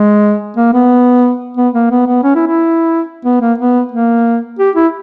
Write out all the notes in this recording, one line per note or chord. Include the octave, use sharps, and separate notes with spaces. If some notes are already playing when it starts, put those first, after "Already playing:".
Already playing: G#3
A#3
B3
B3
A#3
B3
B3
C#4
E4
E4
B3
A#3
B3
A#3
G4
E4